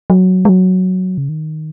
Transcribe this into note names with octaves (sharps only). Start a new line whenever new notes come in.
F#3
G#3
F#3
C#3
D#3